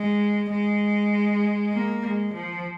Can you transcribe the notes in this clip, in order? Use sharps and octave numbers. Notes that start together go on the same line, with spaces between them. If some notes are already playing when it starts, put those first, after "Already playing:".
Already playing: G#3
G#3
A#3
G#3
F3